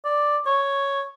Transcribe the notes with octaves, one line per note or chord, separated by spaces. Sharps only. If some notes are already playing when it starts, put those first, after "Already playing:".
D5
C#5